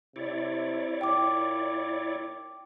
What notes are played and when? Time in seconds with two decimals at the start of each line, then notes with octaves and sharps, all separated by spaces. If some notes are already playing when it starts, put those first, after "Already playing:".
0.16 C3 E4 C#5 D5
1.01 A#2 G5 D6